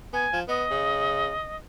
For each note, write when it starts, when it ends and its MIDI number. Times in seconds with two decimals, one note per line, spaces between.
0.13 0.27 59
0.13 0.40 80
0.33 0.43 53
0.48 0.65 59
0.48 1.57 75
0.71 1.33 49